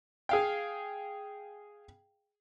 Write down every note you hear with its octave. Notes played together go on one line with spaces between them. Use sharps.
G#4 F5 G5